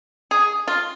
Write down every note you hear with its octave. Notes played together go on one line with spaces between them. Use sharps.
G#4
F4